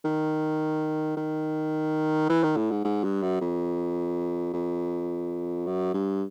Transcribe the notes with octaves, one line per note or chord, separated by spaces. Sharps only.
D#3
D#3
E3
D#3
A2
G#2
G#2
G2
F#2
F2
F2
F#2
G2